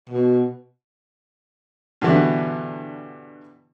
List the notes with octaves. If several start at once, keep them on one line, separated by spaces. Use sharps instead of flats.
B2
G2 B2 D3 E3